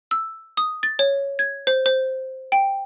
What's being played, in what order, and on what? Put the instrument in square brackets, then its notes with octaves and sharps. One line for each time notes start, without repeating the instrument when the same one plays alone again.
[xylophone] E6
D#6
A6
C#5
G#6
C5
C5
G5